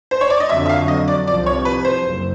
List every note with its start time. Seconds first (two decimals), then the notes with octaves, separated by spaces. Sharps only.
0.11 C5
0.21 C#5
0.30 D5
0.40 D#5
0.49 F2 D3 F#3 E5
0.66 E5
0.69 F5
0.88 D#5
1.08 D5
1.27 C2 C3 F3 D5
1.46 C#5
1.65 B4
1.85 C5
2.04 F#1